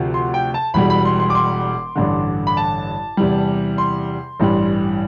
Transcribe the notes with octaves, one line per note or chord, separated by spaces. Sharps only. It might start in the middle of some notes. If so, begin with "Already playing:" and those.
Already playing: D2 C3 F3
C6
G5
A5
E1 E2 B2 G3 B5
B5
C6
C6
D6
C6
A1 G2 D3
B5
A5
E2 C3 E3 G3
C6
A1 G2 E3 G3